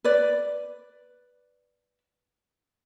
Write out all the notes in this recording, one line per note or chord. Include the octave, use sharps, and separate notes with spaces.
B4 D5